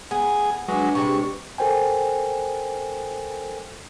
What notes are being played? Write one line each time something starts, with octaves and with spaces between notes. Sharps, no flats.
B3 G#4
F#3 G#3 D4 B4
C3 G3 G#3 C#6
A4 A#4 C5 G5 G#5